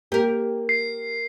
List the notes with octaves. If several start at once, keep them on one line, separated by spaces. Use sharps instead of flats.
A#3 G4 A#4
C7